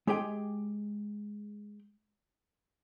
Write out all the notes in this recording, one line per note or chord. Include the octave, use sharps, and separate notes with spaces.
G#3 G4 G#4 G5